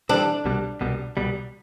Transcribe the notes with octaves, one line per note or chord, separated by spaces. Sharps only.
E3 G3 C4 D4
C2 B2 G3
C2 B2 G3
C2 B2 G3